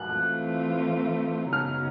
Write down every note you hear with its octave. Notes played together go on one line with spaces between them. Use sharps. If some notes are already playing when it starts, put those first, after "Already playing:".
Already playing: F#6
E3 A3 C4 F4
F#2 C#3 F#3 B3 D#4 F6